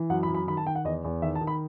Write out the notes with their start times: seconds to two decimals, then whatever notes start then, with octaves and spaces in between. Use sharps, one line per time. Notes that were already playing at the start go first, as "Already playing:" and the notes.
Already playing: E3
0.10 F#2 F#5
0.23 B5
0.28 F#2
0.35 B5
0.47 D#3 B5
0.57 A5
0.66 D#3 G5
0.75 F#5
0.85 E2 D#5
1.04 E2
1.22 D#3 E5
1.35 A5
1.41 D#3
1.47 B5